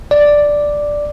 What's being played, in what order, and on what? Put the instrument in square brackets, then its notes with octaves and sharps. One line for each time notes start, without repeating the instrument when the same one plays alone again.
[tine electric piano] D5